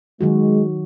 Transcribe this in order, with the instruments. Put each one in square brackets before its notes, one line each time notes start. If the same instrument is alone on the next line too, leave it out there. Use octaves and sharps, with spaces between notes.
[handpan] D#3 F#3 F#4 [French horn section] G#3